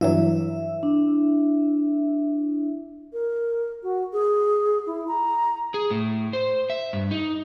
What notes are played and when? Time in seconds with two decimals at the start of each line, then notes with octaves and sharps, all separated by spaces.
0.01 G2 E3 F#3 E4 E5
0.83 D4
3.13 A#4
3.83 F#4
4.13 G#4
4.87 E4
5.08 A#5
5.74 G#4
5.90 A2
6.33 C5
6.70 E5
6.93 G2
7.11 D#4